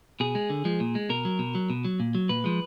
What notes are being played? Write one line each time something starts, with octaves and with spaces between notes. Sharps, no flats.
B2 G#4
G#3
D3
F3 G#3
A#2
G#3
B2 A#4
F#3
B2
F#3
B2
F#3
A#2
F#3
A#2 B4
F3 G#3